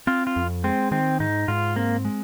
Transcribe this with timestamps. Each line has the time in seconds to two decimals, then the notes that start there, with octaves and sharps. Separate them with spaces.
0.07 C4 F4
0.27 F4
0.36 F2
0.64 G#3 C4
0.91 D#3 C4
1.20 G#2 D#4
1.48 G#2 F4
1.76 A#3 C4
2.05 G#3